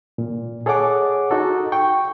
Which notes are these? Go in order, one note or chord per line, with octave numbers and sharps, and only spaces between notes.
A#2
G#4 A4 C#5 D#5 F#5 D6
D#4 F#4 A4
G5 C#6